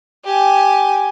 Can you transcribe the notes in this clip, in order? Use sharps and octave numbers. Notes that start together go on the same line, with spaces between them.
G4 G#5